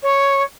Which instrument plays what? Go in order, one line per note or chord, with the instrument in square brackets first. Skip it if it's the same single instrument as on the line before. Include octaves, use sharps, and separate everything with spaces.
[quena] C#5